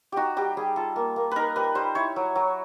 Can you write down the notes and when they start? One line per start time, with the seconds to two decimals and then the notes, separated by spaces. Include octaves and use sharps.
0.12 D#4 F#4 G4
0.36 G3 G4
0.57 G3 G#4
0.76 F4 A4
0.96 A#3
1.16 A#3
1.31 D#4 A#4 B4
1.56 G3 B4
1.75 G3 C5
1.95 E4 C#5
2.16 F#3
2.36 F#3